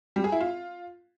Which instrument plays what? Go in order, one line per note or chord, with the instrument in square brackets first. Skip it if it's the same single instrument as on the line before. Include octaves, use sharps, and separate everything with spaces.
[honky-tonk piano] G3
G#4
E4
F4